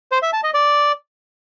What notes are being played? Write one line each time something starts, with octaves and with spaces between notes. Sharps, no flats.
C5
E5
A5
D#5
D5